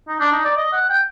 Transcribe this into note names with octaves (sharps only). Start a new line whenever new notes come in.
D#4
D4
D#4
D5
D#5
F#5
G5